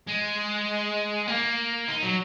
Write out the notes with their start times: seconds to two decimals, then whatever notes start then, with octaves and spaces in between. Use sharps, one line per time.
0.08 G#3
1.28 A#3
1.88 D#4
2.02 F#3